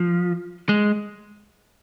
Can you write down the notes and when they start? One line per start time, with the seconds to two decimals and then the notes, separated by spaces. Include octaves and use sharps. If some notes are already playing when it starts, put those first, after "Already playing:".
Already playing: F3
0.69 G#3